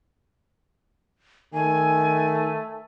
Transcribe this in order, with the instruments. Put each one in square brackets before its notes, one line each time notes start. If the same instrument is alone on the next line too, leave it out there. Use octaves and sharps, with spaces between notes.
[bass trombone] D#3 [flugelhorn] A3 [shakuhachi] G#5